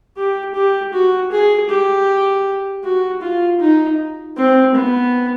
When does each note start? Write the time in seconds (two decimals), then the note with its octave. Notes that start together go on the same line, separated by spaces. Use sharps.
0.17 G4
0.55 G4
0.93 F#4
1.32 G#4
1.69 G4
2.84 F#4
3.22 F4
3.60 D#4
4.37 C4
4.74 B3